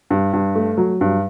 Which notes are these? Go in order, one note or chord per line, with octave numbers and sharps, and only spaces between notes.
G2
G2
A3
F#3
G2